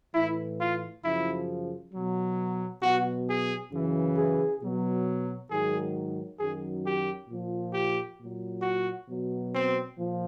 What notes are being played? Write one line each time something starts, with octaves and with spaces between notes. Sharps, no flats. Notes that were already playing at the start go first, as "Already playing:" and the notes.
A2 E3 E4
F4
F#2 C#3 F3 E4
B2 F#3
B2 F#3 F#4
G#4
F#2 C#3 E3
G#4
B2 F#3
G#2 D#3 F#3 G#4
F#2 D#3 F#3 G#4
G4
A#2 F3
G4
A#2 F#3
F#4
B2 F#3
C4
A#2 F3